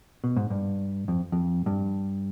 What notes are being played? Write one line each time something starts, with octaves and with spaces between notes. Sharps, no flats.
B2
G#2
G2
F2
F2
G2